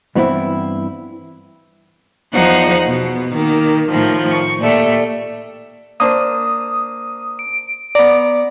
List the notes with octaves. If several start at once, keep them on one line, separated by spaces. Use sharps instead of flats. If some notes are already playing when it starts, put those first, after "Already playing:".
G2 E3 B3 C4 E4
E2 F3 D#4 C5 F#5
B2
D#3 A#3
A2 D#3 F3
C#6
A#2 G3 A3
A#3 D4 C5 D#6
D7
B3 D5 A#5